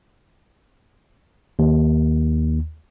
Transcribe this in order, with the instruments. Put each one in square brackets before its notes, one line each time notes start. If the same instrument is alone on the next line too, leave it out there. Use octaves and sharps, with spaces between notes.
[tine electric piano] D#2